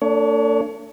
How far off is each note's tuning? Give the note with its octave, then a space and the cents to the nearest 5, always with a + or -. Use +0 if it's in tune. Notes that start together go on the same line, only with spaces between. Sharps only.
A3 +40 D4 -15 C#5 +30